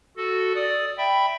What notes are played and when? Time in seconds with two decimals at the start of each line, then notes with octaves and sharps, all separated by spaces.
0.17 F#4 A4
0.55 D5 D#6
0.98 E5 G5 B5